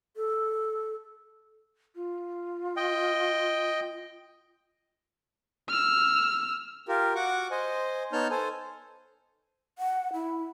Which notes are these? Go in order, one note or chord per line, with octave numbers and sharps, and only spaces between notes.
A4
F4
D#5 G5
E6 F6
F4 G4 A#4
F#4 F#5 C#6 D6
C5 D#5 G#5
B3 D#4 C#5 A5 F6 G6
A4 C5 G#5
F#5
E4